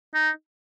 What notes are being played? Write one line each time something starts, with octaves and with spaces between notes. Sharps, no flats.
D#4